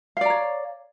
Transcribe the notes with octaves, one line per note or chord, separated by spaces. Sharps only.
C#5 D5 F5 A#5